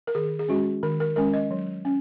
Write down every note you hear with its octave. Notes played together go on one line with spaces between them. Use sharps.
A#4
D#3 G#4
G#4
G#3 C#4 F#4
D#3 A#4
A#4
G#3 C#4 A#4
D#5
F#3
C#4